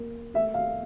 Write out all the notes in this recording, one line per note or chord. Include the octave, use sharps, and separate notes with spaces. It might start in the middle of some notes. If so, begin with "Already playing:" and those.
Already playing: A#3
A3 E5
F5